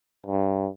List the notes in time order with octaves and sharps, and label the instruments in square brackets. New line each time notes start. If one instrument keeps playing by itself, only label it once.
[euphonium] G2